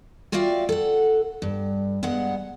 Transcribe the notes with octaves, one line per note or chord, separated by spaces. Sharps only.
F4 F#4 D5 E5 F5 G5
A4 F#5
G2
G2 G#3 B3 F#5